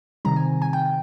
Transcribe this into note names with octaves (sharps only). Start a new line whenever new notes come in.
C3 D#3 G3 C4 A#5
G#5
G#5
G5